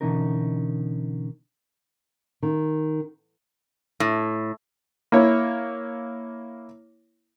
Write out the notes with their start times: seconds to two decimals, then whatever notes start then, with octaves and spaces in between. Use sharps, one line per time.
0.01 B2 D3 E3 C#4 D#4 A#4
2.42 D#3
4.00 A2
5.12 A#3 E4 C#5